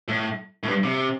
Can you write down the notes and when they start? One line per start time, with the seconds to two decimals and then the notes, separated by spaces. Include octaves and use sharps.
0.08 A2
0.63 A2
0.68 G2
0.84 C3